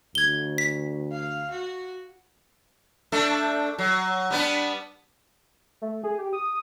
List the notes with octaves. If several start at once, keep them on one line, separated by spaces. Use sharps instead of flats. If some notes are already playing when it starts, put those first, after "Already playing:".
D2 G#6 G7
B6
F5
F#4
A3 D4 A4
F#3
G3 B3 D4
A3
G#4
G4
D#6